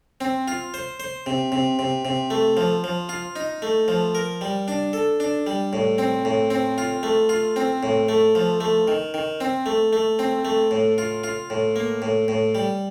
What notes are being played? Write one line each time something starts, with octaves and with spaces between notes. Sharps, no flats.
C4
F4
C5
C5
C3
C3
C3
C3
A3
F3
F3
F4
D#4
A3
F3
A#4
G3
D4
A4
D4
G3
A2
C4
A2
C4
F4
A3
F4
C4
A2
A3
F3
A3
D#3
D#3
C4
A3
A3
C4
A3
A2
F4
F4
A2
A#3
A2
A2
G3